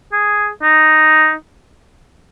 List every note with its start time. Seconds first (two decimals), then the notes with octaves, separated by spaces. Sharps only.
0.13 G#4
0.63 D#4